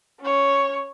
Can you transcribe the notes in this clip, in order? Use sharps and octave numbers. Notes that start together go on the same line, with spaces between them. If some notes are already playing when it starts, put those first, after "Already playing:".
C#4 C#5